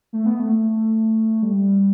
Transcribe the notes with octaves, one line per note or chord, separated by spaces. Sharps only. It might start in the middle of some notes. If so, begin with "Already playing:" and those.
A3
B3
A3
G3